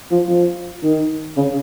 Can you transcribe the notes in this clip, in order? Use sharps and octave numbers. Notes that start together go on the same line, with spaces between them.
F3
F3
D#3
C#3